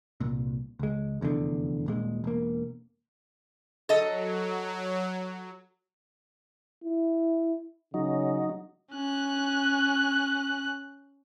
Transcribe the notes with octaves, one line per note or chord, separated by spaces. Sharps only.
C2 A#2
C#2 G#3
F1 E2 B2 D3
D#1 A#2 G#3
E1 A#3
F#3 A4 D#5
E4
C#3 F#3 D#4
C#4 F#6